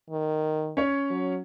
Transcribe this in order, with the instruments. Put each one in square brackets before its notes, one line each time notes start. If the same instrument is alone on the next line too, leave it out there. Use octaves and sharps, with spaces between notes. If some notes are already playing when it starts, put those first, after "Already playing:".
[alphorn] D#3
[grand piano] C#4 C#5
[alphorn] F#3